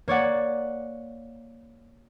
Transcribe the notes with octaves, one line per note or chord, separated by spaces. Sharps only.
A#3 C#5 D5 F#5